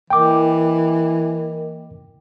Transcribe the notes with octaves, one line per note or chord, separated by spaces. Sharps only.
E3 A#3 A#4 D#5 G5 D6